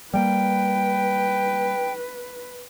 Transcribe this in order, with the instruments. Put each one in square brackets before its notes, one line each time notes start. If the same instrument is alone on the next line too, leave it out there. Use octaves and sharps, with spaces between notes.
[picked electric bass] G3 G#3 A#3 [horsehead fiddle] B4 [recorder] G5